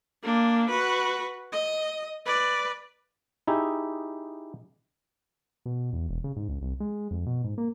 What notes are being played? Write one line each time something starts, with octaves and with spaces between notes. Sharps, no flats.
A#3 D4
F#4 B4
D#5
B4 D5
D#4 E4 G4 G#4
B2
E2
E1
C#3
G#2
C#2
C2
G#3
F2
B2
G#2
A#3